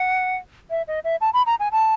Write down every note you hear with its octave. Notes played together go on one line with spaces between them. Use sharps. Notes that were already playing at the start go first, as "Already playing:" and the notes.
Already playing: F#5
E5
D#5
E5
A5
B5
A#5
G#5
A5